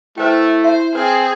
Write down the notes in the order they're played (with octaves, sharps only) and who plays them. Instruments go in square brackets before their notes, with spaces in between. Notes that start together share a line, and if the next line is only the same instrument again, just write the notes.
[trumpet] A3 [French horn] E4 [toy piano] B4 C5 G5 [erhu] E5
[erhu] C5 [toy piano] E5
[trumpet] C4 [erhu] G#4 [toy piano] B4